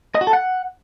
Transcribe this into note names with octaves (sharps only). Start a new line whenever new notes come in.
D#5
F#4
A4
F#5